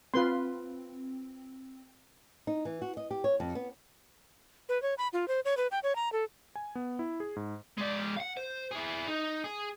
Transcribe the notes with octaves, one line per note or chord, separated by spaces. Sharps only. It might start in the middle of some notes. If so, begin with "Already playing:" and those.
C4 F4 B4 C6
D#4
E3
F#4
D#5
G4
C#5
F2
B3
B4
C#5
B5
F4
C5
C#5
B4
G5
C#5
A#5
A4
G#5
B3
E4
G#4
G#2
G#3 D5
F5 F#5
C5
E4 G#4
D#4
G#4